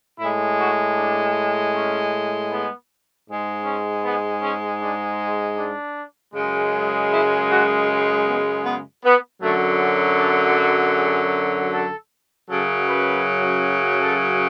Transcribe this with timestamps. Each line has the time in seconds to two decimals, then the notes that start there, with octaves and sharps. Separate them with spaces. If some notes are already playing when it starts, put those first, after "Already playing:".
0.19 A2 E4
0.24 G#3
0.58 F#4
0.96 D4
1.73 C#4
2.50 B3
3.26 G#2 G#3
3.65 C#4
4.04 B3
4.42 C#4
4.80 D4
5.57 D4
6.33 F#2 C#3 G#3
7.11 E4
7.50 F#4
7.87 G#4
8.26 B3
8.65 B3
9.03 B3
9.41 F#2 D3 F#3 A3
9.80 C#4
10.18 D4
10.56 F#4
10.96 G#4
11.71 A4
12.49 F#2 C#3 F#3 A4
12.88 B4
14.02 A4